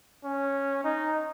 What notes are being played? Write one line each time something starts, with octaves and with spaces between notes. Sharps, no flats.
C#4
D#4